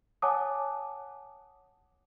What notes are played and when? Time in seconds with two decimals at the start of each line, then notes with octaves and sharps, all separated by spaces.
0.22 C#5 F#5 G#5 A5 D6 D#6